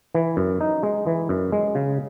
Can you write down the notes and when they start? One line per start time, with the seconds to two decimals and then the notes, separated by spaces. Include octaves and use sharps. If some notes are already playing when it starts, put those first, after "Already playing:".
0.15 E3
0.37 F#2
0.61 D#4
0.83 G#3
1.07 E3
1.29 F#2
1.52 G#3
1.75 C#3